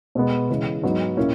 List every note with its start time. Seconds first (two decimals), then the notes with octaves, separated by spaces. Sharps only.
0.15 B2 G#3 B3
0.50 C#3 E3 G#3
0.83 G#2 F#3 B3 D#4
1.17 A#2 A#3 C#4 E4